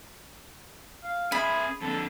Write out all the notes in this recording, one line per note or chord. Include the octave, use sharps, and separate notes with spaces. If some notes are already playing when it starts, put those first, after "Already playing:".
F5
C#4 G#4 E5 B5
F2 D3 A4